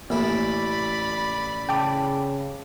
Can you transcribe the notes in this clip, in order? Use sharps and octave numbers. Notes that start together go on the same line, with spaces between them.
A1 A#3 E4 D5 B5
C#3 G5 A5 D6